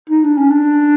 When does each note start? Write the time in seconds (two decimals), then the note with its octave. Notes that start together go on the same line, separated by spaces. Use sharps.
0.10 D#4
0.24 D4
0.37 C#4
0.51 D4